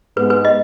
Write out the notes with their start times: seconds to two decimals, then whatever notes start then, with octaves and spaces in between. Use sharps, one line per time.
0.17 G#2 G#3 B3 B4
0.30 B4
0.45 D#5